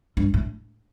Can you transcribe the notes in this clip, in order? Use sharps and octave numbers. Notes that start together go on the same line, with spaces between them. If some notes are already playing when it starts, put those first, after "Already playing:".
G2
A2